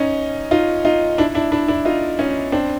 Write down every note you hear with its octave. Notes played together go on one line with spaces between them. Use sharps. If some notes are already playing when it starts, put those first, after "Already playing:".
Already playing: C#4 D#4
D#4 F4
D#4 F4
D4 E4
D4 E4
D4 E4
D4 E4
D#4 F4
C#4 D#4
C4 D4